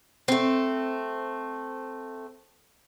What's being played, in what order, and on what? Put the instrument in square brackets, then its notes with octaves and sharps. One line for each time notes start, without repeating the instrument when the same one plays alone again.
[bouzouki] A3 C4